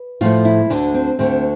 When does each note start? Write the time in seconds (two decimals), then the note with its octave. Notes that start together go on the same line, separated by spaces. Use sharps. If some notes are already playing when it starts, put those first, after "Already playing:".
Already playing: B4
0.21 A2 F3 A3 F4
0.45 E4
0.70 D2 D3 A3 D4
0.94 C4
1.19 D2 D3 A3 C4